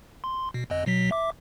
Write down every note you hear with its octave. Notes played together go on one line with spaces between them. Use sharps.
C6
B2
G1 F2 D#5
B2 F#3 B6
E5 D6